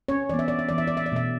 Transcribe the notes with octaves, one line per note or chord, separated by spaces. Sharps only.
C#4 C#5
E3 B3 D5
E5
D5
E5
E3 B3 D5
E5
D5
E5
D5
B2 A3 E5